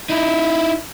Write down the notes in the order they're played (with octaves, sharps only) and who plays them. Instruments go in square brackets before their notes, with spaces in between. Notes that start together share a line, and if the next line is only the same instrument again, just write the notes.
[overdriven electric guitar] D#4 E4